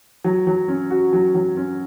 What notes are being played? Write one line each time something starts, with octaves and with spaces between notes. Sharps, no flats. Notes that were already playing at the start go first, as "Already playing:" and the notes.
F#3
F#3
C#4
F#4
F#3
F#3
C#4